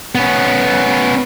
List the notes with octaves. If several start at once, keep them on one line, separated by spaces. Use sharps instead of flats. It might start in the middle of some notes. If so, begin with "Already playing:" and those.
B3 C#4